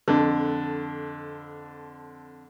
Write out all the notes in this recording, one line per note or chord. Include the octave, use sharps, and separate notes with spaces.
F2 D3